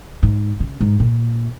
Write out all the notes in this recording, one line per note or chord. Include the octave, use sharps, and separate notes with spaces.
G#2
C#3
G#2
A#2